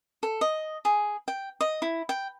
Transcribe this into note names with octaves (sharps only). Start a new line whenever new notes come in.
A4
D#5
G#4
G5
D#5
E4
G5